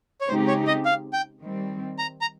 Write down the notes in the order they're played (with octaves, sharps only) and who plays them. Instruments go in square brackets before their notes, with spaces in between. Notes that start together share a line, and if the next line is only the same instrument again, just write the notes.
[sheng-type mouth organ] C#5
[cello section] C#3 G#3 C4 D#4 G4 [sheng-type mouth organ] C5
[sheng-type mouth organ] C#5
D#5
F5
G5
[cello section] D#3 G3 C4
[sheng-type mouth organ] A#5
A#5